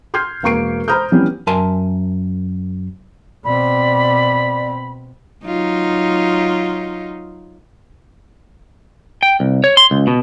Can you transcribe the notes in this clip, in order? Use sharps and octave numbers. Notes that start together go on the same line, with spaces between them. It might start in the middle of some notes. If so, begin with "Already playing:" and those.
C6 F6 G6 G#6 C7
E1 A#3 A#4 C#6 C7 D7
C5 A#5 B5 D#6 F6 G6
E3 G3 B3 C#4
F#2 A#4 E5 G#5 A5 C6
B2 C4 D5 B5
F#3 D#4 F4
G5
C2
C#5
C6
C#2
B2